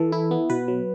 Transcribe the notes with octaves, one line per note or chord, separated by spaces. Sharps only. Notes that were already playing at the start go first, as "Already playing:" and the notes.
Already playing: E3 A4
E4
B3
B2 B4
F#3